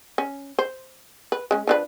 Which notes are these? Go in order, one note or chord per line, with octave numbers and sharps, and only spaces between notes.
C#4
C5
B4
G#3 C#4
F3 D4 B4